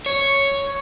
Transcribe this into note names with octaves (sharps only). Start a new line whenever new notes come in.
C#5